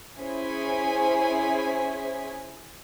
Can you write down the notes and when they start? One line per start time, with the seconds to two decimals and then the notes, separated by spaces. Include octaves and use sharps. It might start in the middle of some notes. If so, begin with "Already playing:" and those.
0.18 C#4 E4 G#4 C5 G#5 B6